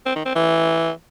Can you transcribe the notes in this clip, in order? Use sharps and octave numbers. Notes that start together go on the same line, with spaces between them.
C4
D#3
C4
E3